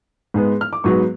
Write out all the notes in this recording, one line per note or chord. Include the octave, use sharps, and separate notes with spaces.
G#2 G#3 B3
F6
D6
G#2 F#3 B3 C#6